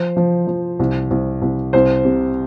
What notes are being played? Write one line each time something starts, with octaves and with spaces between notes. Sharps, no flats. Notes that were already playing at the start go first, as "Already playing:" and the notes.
Already playing: F3 C5
F3
F3
C2
C2
C2
C2 C5
C3